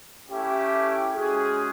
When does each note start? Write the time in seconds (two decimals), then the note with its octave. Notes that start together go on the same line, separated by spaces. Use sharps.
0.28 A3 C#4 E4 G4
1.14 G#3 C#4 F#4 G#4